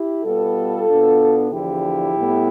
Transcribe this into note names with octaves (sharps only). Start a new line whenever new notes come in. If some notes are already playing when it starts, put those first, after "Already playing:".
Already playing: E4 G4
B2 G3 B3 F4 A4
B2 B3 D4
E2 D3 F3 E4 G4
A2 G3 B3